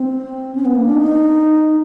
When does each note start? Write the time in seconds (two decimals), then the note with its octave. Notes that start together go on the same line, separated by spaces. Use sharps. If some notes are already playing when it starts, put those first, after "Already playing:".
Already playing: C4
0.55 C#4
0.65 B3
0.75 A#3
0.86 D4
0.95 D#4